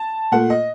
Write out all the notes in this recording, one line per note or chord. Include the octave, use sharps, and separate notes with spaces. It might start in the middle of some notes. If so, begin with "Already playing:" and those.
Already playing: A5
A#2 A3 F#5
D#5